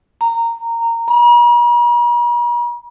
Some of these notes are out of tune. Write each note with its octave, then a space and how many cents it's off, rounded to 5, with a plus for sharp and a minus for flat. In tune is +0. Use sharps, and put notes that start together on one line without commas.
A#5 -15
A#5 +45